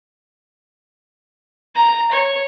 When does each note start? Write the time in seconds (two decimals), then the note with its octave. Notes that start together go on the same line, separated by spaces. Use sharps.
1.75 A#5
2.12 C#5